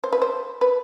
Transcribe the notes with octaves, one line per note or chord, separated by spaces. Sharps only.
C5
B4
C5
B4